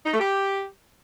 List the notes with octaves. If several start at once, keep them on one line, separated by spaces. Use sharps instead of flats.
D#4
A3
G4